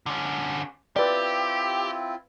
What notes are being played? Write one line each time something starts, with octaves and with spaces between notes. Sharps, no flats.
D3 C#4
C4 E4 F4 G4 B4 D5